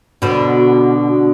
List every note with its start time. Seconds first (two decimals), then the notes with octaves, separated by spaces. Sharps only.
0.22 B2 D3